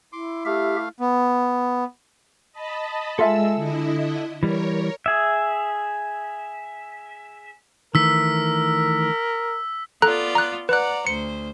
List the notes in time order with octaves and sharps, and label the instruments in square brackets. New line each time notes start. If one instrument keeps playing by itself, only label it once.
[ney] E4 [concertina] C6 D6
[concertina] A3 F5 [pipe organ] G4 E5
[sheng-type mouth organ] B3
[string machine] D#5 A5 B5
[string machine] G#3 E6 [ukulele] F4 E5 G#5 [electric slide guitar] A4 A5
[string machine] D3 E4 D#5
[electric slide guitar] E3 G3 [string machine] A#4 C#5
[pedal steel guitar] G#4 E5
[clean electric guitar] D#3 E3 A3 [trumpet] A#4 [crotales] E6 B6
[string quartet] B3 F4 D5 [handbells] A4 A#5 F#6
[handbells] A#5 F#6
[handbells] B4 F#6 [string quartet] D5 F#5 A#5
[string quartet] D2 C5 [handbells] C#7